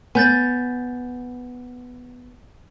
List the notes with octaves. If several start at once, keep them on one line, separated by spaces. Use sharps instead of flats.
B3 G#5 G6 A6